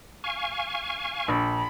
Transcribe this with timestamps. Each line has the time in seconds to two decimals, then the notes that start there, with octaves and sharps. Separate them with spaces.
0.24 F5 G#5 C#6
1.28 A#1 B5